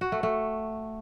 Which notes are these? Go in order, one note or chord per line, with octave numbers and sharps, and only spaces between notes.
F#4
A3
A3